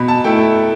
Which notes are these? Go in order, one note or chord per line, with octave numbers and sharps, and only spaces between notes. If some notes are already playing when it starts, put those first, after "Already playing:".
Already playing: B2 B5
A5
A3 E4 G5